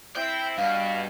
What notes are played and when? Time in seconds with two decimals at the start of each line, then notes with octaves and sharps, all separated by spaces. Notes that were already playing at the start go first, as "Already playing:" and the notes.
0.16 C4 E4 G5
0.58 G2 B2 F5